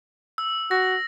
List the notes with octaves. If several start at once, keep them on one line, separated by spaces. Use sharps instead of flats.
E6
F#4 A#6